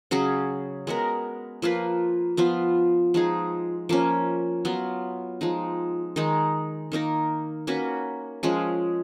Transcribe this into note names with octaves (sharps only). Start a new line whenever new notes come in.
C#3 F#3 C#4 G#4
G#3 B3 F#4 A#4
F3 A#3 F4 B4
F3 B3 F4
F3 G#3 D#4 G#4
F3 A#3 C#4
F#3 B3 F4
F3 G#3 D#4
D#3 G#3 D#4
D#3 A#3 D#4 A#4
A#3 C#4 F#4 B4
F3 G#3 C#4